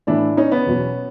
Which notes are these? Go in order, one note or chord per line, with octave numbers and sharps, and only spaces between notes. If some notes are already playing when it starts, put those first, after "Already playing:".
A2 E3 D4 E4
C#4 D#4
B3 C#4
E2 B2 F#3